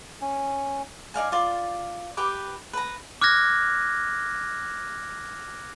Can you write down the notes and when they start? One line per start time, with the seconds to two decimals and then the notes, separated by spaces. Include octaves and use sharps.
0.21 C#4
1.14 D#4 D5 F5 G#5
1.32 F4 D5
2.17 G4 B4 D6
2.73 B4 A#5
3.21 D6 F6 F#6 G#6 A#6